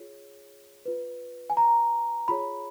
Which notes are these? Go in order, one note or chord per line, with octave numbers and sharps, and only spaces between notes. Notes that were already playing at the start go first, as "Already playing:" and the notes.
Already playing: F4 G#4 C#5
F4 B4
G#5
A#5
F4 G#4 C#5 B5